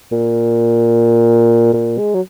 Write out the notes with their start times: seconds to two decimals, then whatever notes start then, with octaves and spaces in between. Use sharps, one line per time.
0.12 A#2
1.74 A#2
1.98 G#3
2.14 F#3